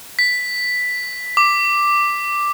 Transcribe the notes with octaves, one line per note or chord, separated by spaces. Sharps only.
B6
D6